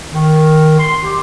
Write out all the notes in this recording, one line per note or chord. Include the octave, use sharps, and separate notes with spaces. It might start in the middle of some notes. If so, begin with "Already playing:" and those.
D#3
C6
G4